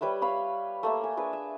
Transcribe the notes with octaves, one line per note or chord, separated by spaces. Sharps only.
G3 B4 C#5 E5
C#5 F5 B5
A3 A#3 E5
G#5
D4 G#4 B4
E5